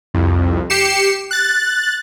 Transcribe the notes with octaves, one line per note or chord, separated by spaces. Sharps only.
C2 F2
G4 C7 C#7 E7
F#6 A6